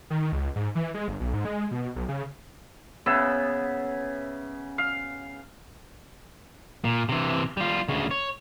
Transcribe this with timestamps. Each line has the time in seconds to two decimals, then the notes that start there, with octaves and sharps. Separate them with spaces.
0.10 D#3
0.32 C#2
0.56 G#2
0.75 E3
0.94 G#3
1.08 G1
1.20 B1
1.34 G#2
1.45 G#3
1.71 B2
1.96 B1
2.08 C#3
3.06 C#3 B3 E5
4.78 F5
6.84 A#2
7.09 C3 E3
7.57 G3 F4
7.88 D2 C#3
8.11 C#5